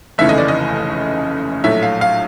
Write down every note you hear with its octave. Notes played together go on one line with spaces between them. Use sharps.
F1 D#2 C#3 E3 A3 E5
D#5
D5
D#5
A#1 A2 F#3 A3 E5
F5
F5